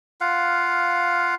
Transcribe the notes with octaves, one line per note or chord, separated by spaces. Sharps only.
F4 F5 F#5